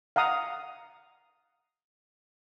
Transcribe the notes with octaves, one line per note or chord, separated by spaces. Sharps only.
F5 F#5 A#5 D#6